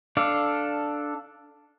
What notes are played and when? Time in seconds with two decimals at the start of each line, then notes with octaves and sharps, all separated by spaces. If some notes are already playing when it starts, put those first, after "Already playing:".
0.17 D4 A4 D5 F5